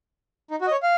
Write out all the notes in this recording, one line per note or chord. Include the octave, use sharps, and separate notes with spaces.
D#4
F#4
D#5
C#5
F5